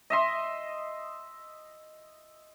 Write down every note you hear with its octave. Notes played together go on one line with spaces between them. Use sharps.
D#5 E5 C6